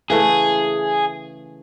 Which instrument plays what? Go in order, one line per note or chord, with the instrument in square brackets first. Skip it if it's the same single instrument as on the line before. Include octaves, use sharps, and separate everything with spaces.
[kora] C#3 E3 A3 [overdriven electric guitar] G#4